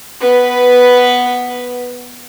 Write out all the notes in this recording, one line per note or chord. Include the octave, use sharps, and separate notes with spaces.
B3 B4